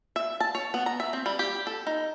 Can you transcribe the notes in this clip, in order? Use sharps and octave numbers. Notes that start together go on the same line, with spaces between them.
E5
A5
C#5
B3
A#5
E5
C4
G3
G4
A4
D#4